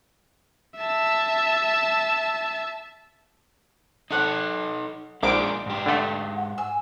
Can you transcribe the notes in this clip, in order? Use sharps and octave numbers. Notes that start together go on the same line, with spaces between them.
E5 A5
D#4 A4 C#5 F#5 D6
A#1 G#3 D4 D#4 G#4 F5 D6 D7
G#2 G4
D3 A3
F#5
G#5 E6